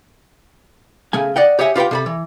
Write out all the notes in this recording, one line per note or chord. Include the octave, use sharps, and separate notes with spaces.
C#3 A3 G#5
D5 D#5 F#5 G5
G4 C#5 D#5 E5 F#5 G#5
F4 G4 B4 F#5 G5
C3 A4 B5
E3